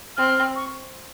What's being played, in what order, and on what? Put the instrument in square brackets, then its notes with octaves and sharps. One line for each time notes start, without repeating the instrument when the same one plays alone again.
[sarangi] C4 [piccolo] F6
[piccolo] C#6